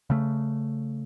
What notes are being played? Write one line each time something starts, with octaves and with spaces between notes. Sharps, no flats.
C#3 A3